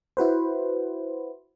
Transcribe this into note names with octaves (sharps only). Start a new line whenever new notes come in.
E4 F#4 B4 C5